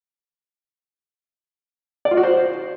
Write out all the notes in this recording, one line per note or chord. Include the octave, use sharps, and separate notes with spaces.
D5
F4
F#4
C5